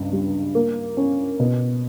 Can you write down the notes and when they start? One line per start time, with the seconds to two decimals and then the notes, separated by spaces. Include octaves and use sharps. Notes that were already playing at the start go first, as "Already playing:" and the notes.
Already playing: C#2 G2
0.13 G3
0.55 A#3
0.97 C#4
1.40 B2